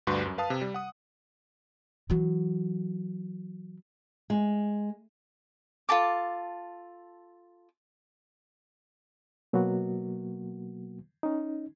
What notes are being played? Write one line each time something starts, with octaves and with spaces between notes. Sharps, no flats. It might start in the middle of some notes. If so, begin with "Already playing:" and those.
D2 G2 G3 F#4 B4 C6
F#2
B4 F5 A5 D#6
C3
G3
F#5 D#6
E3 F#3
G#3
F4 A4 A5 D6
B2 F#3 A#3 B3 F#4
C#4 D#4